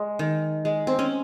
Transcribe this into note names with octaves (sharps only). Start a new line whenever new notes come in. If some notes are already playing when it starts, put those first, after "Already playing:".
Already playing: G#3
D#3
G#3
C4
C#4